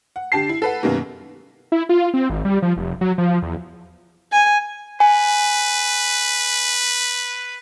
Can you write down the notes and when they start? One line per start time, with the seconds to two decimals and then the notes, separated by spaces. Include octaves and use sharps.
0.16 F#5
0.32 D3 G4 A5 C7
0.49 E4
0.62 A4 B4 F#5
0.83 F#2 B2 D#3 G3 A#3
1.72 E4
1.89 F4
2.14 C4
2.30 G#1
2.45 G3
2.62 F3
2.77 F1
3.01 F#3
3.18 F3
3.42 E2
4.32 G#5
5.00 B4 G#5